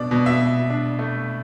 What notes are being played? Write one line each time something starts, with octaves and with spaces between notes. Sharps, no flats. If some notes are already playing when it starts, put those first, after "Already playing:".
Already playing: B2 D4 D5
B2
E5
B2
D4
A3